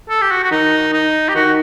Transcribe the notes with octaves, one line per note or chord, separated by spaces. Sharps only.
A4
G4
F#4
F#4
D#3 D#4
D#4
G4
D#3 F#4